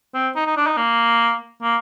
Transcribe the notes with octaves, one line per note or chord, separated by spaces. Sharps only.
C4
D#4
D#4
D4
D#4
A#3
A#3